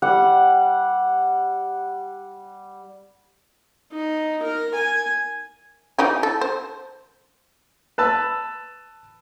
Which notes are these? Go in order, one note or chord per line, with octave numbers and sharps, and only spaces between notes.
G3 F#5
D#4
A#4
G#5
E3 D#4 G4
A4
C5
B4 A5 E6